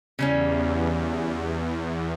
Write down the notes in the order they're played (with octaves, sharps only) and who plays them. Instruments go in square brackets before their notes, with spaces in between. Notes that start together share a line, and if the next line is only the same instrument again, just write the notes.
[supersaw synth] E2 [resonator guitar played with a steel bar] C#3 G3 C#4